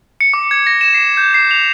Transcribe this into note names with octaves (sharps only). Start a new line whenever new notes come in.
C#7
D6
G#6
A#6
E7
C7
G6
C7
F7